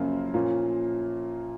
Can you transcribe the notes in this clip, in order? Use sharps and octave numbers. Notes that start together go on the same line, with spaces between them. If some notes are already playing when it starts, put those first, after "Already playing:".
Already playing: F#2 C#3 F3 A#3 F4
A#2 F3 A#3 C#4 F4